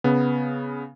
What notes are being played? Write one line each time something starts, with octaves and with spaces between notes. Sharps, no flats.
C#3 B3